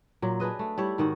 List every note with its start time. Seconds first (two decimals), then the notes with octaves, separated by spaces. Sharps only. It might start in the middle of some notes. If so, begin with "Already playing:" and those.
0.22 A#2 F#3
0.40 D4 G#4 B4 D#5
0.59 A3
0.78 G3 E4 C#5 E5
0.98 G#2 D#3 F#4